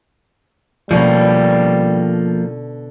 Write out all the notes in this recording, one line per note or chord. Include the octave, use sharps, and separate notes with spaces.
B2 D3 F3 G3 A#3 C#4